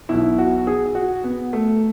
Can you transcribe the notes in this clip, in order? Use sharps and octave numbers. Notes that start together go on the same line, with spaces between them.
B1 B2 E4
F#4
G#4
F#4
B3
A3